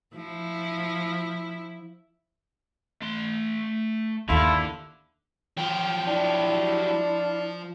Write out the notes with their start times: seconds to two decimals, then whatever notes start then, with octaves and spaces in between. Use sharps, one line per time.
0.15 F3 E4
3.02 A3 C6
4.29 G1 D#2 D3 E4 F4 A4
5.58 F3 F#3 G4
6.07 D4 E4